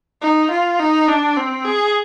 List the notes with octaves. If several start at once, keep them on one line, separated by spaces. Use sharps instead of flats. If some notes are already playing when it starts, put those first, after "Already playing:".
D#4
F4
D#4
D4
C4
G#4